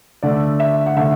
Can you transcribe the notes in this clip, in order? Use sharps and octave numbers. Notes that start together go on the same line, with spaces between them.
D3 A3 D5
E5
F#5
D3 A3 E5